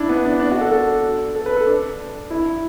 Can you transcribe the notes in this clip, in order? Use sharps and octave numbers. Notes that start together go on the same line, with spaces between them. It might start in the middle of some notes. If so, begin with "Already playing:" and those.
Already playing: D4 E4
B3
D4
D4
F#4
A4
A4
A4
B4
A4
D4
E4